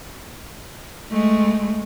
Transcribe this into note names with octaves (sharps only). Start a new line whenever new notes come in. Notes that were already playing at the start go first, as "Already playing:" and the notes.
G#3 A3